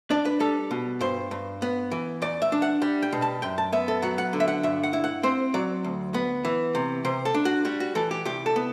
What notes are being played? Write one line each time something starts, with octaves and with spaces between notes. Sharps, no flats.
D4 D5
B4
G3 A4
B2
G2 C5
G2
B3
E3
E2 D5
E5
D4
F#5
G3
G5
B2
A5
F#2 G5
A5
B3 E5
A4
F#3 F#5
F#5
D3
E5
F#5
G2 E5
F#5
E4
F#5
C4 C5
F#3 D5
D2
B3
E3
C3
C3 C5
A4
D4
F#4
G3 F#4
F#4
E3 A4
G4
C2 G4
A4
B3